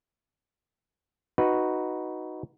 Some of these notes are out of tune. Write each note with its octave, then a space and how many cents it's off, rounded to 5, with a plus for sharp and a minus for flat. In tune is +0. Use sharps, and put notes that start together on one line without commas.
D#4 +0 F#4 +0 B4 +0